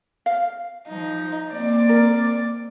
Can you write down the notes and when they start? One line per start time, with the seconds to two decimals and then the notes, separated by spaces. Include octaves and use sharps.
0.26 F5
0.88 F3 D#4
1.52 A#3 C4 D5
1.89 A#4